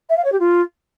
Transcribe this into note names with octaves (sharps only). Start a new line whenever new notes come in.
E5
F5
C#5
G4
F4